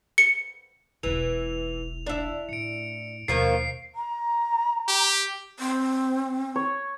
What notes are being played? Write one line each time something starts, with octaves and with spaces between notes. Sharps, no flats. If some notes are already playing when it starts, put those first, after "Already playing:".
C#7
E1 B1 E3 F7
D4 E4
A2 C#7 D7
D#2 B2 D#3 F3 A#3 C7
A#5
G4
C4
C#5